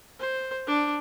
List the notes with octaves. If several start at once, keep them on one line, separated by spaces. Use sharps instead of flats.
C5
D4